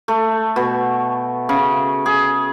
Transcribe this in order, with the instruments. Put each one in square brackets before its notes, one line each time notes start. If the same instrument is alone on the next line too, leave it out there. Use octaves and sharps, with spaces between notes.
[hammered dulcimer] A3
B2
C#3
G#4